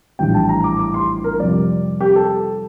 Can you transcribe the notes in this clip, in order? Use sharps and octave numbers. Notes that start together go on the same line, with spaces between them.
A#1 A2 E3 G3 G5
A5
A#5
D6
D6
C6
A#4
F2 C3 G3 D5
G4
A4